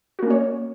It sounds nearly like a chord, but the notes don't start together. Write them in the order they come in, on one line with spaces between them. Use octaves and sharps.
F#4 A#3 C#4 C#5